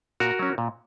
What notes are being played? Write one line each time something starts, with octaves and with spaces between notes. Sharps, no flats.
A#2 F#4 A#4
F#3 C#4
A#2